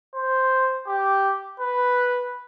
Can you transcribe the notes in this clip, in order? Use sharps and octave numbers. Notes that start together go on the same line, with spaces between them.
C5
G4
B4